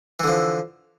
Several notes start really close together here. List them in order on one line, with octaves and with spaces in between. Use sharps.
E3 D3 F3